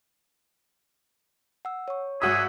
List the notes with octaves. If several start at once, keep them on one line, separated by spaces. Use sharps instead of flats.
F#5 E6
C#5 C#6
G#1 F#4 G#4 E5 D#6